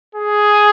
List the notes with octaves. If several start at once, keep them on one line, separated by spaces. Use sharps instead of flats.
G#4